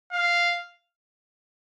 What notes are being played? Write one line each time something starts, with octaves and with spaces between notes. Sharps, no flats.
F5